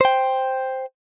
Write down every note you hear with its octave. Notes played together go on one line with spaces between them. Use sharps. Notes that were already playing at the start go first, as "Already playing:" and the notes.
C5 G5